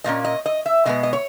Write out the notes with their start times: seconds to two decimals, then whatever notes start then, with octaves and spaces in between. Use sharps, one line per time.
0.04 A#2 A#3 C#4 D#5
0.25 D#5
0.46 D#5
0.66 E5
0.85 B2 G#3 B3 D#5
1.03 D#5
1.13 C#5